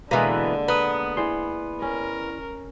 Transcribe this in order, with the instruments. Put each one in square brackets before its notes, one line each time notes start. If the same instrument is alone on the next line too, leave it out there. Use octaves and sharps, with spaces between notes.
[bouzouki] B2 E3 [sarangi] D3 [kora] G#3 A#3
[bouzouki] B3 [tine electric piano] A#5 D#6
[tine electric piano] E4 D5 C6 [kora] G#4 C5
[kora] C#4 [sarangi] A#4